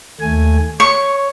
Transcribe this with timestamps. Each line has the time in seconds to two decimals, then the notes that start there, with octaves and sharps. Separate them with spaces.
0.21 D#2 A3 G#5
0.80 C#5 C#6